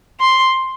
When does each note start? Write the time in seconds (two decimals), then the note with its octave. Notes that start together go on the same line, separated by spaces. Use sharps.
0.21 C6